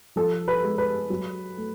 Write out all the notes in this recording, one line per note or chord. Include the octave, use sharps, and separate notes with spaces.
F3 A4
B4
G#3
B4
F#3
A3